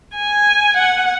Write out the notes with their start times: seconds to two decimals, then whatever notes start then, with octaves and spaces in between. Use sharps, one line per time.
0.15 G#5
0.77 F#5